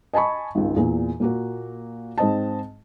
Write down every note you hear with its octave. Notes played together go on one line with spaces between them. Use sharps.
D#5 G#5 A5 B5 C#6
G#1 C#2
E2 A#2
A#2 A#3 F#4
G#2 C4 D#5 A5